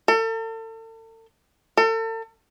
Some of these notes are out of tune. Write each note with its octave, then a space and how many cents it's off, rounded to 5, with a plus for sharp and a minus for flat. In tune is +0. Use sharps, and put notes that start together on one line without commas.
A4 +40
A4 +40